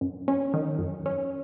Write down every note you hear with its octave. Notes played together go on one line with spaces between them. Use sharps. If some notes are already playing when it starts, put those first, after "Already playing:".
F#2
C#4
D#3
F#2
C#4